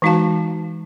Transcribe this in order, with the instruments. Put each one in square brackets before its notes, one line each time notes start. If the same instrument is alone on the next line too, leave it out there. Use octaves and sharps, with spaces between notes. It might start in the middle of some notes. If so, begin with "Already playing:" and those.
[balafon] E3 G#3 D#4 F#4 F5 A5